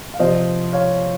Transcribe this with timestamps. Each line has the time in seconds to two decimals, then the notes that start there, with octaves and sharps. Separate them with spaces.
0.14 F5
0.19 C3 F3 C5 D#5
0.73 C#5 F5